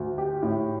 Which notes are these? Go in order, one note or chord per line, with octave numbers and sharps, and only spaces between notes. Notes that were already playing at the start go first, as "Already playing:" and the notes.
Already playing: D2
G4
A2